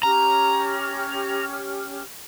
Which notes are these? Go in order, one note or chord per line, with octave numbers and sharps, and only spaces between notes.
C#4 G4 A#5 F6